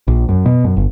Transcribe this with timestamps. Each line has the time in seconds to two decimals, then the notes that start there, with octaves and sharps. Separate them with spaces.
0.08 A#1
0.29 F#2
0.46 B2
0.64 F#2
0.77 G1